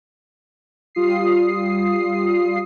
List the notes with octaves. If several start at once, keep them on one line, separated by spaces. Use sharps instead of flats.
G3 F4 D#6 C7